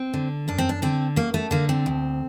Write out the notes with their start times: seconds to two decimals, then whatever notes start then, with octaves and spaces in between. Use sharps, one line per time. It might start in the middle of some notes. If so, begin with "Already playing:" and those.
Already playing: C4
0.14 D3
0.48 F#2 D4
0.58 C4
0.69 D4
0.82 D3 C4
1.16 F#2 A#3
1.34 A3
1.51 D3 A#3
1.69 C4
1.86 D2